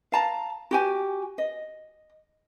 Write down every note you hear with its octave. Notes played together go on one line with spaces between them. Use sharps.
F5 A5 A#5
F#4 G4 G#5
D#5